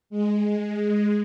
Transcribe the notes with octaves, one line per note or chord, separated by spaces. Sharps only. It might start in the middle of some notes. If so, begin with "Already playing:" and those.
G#3